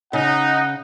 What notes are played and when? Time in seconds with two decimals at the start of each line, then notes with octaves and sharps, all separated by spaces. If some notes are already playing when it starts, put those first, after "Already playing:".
0.13 C#3 D#4 F#5